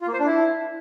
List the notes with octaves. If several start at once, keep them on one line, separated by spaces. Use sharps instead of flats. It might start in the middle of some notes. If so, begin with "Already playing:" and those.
F4
A#3
C5
D4
E4